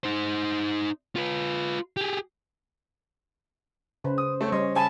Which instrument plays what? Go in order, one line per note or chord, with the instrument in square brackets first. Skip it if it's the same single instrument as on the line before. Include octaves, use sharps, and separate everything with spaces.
[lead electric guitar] D#4 C5
F4 B4
G4 G#4
[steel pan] C#3 B4 [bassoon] C5
[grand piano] D#6
A3 C4 C#5
[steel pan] G3 C#4 [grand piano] C#5 D#5 C6
[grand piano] C#3 G#5 B5 [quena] A5